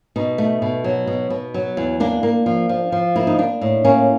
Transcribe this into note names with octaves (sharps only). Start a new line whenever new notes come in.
B2 D#4
A3
B2
F#3
B2
B2
F#3
E2
A#3 D4
A#3
F3
F3
F3
A#3 E4
D#4
A#3 D4
A2
A#3 C#4